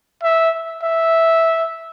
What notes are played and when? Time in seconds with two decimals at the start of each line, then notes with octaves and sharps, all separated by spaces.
0.23 E5
0.83 E5